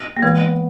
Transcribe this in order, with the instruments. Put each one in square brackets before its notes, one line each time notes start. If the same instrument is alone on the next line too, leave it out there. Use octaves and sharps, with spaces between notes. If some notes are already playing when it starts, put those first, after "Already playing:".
[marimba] A#3
[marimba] E3 G#3 [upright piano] B3